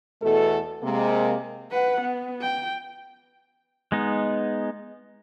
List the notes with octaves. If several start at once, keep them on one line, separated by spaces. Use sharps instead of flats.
E2 B2 A3 A4
C3 G#3 A#3
B4 F#5
B3
G5
G#3 B3 D#4